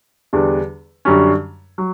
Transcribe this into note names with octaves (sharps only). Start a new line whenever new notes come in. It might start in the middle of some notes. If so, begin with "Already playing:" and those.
E2 D3 G3 D4
F#2 D3 G3 C#4
F#3